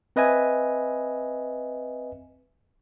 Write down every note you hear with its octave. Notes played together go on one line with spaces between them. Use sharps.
C4 B4 D#5 E5 G#5